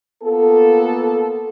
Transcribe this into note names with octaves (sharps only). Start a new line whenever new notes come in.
A#3 B3 F4 A4